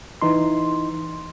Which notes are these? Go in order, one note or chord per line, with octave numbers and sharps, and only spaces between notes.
E3 D#4 C6